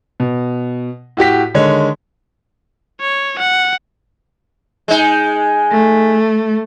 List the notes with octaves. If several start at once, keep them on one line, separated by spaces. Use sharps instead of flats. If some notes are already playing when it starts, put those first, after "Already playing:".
B2
A2 F#4 G4 B6
D3 D#3 G#3 C#5
C#5
F#5
G#3 D#4
A3